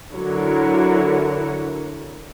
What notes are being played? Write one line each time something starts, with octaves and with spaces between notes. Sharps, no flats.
D3 F#3 E4 F#4 A#4 C#5